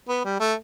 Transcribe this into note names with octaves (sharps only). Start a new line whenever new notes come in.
B3
G3
A3